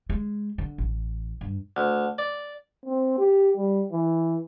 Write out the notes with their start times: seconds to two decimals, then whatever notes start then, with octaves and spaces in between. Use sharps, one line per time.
0.10 G#3
0.58 D3
0.78 A1
1.41 G2
1.77 D2
2.18 D5
2.85 C4
3.18 G4
3.57 G3
3.92 E3